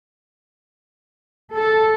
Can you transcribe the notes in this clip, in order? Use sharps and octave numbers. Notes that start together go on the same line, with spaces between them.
A4